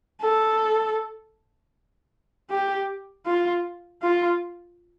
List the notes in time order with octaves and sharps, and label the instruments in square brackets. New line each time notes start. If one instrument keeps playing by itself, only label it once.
[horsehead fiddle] A4
G4
F4
F4